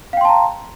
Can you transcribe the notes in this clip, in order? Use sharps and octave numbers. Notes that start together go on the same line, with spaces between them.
F5 G5 A5 A#5 C6